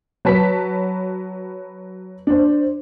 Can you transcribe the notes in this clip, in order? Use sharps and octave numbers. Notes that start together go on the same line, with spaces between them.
F#3 B4 A5 B6
D4 C5